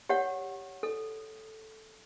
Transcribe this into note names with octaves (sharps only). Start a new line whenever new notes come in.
G4 C#5 F#5
A4